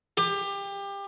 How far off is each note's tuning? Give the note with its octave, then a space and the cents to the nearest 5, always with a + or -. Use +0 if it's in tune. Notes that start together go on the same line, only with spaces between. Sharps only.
G4 +25